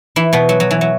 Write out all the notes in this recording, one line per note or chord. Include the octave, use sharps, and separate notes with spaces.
E3 E4
B2 B3
F#3
F#3
E3
F#3